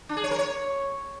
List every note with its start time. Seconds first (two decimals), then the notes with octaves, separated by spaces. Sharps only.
0.09 D4
0.17 G#4
0.24 C#5
0.31 A#4
0.38 C#5